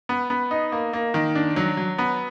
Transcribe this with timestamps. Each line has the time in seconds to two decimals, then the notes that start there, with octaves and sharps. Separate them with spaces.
0.09 B3
0.30 B3
0.51 D#4
0.72 A#3
0.93 A#3
1.14 D#3
1.35 D4
1.56 F#3
1.77 F#3
1.98 B3